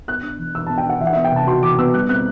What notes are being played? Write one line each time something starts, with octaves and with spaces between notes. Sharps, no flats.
B3 F#6
D4
E3
E3 E6
B3 A5
G5
D4 F#5
E3 E5
F#5
B3 E5
G5
C3 A5
F#4 C6
E3 D6
B3 E6
G3 F#6
C4 F#6